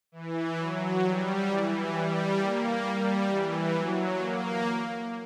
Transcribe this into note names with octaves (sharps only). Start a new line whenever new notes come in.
E3
F#3
G3
E3
G3
A#3
G3
E3
F#3
A#3